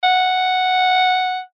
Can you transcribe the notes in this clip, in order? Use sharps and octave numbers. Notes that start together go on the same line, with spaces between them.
F#5